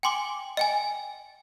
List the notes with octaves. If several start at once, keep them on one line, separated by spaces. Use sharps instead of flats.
G5 G#5 C6 D6 G7
D#5 G5 G#5